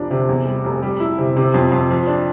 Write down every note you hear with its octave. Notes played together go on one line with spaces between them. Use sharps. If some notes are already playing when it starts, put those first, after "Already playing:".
Already playing: F1 F3 D4
C3
E2
G3
F1
G3
E4
C3
C3
F2
F2
F3
D4